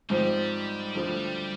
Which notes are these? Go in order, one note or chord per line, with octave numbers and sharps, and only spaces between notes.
G#2 F3 G3 C4
D2 D3 F3